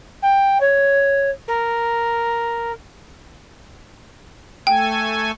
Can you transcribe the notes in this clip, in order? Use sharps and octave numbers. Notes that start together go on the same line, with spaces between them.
G5
C#5
A#4
A3 A4 G5 G#5